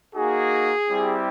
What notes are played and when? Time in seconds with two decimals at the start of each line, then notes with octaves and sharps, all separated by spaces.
0.14 A#3 D#4 F#4 G#4
0.88 G3 C4 E4 G4